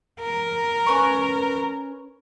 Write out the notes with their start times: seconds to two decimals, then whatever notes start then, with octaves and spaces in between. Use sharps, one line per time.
0.20 A#4
0.86 C#4 B4 C#6